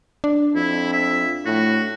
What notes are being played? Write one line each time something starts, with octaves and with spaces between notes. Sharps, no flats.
D4
F2 E4
E5
A2 F#4